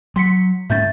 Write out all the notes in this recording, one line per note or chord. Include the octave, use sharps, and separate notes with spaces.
F#3 C6 B6 C#7
G#2 C#4 E5 G6 A6